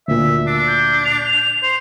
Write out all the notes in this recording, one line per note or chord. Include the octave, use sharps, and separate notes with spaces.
D2 A#2 E5
D4 E6
G6
F7
G6
C5